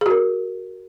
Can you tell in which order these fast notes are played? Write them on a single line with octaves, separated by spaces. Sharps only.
G#4 F#4 A#4